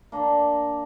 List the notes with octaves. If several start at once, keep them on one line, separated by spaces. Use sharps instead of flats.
A#3 D4